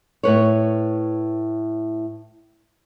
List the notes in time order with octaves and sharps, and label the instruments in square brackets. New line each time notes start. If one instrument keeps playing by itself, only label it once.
[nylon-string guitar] A2 B4 C#5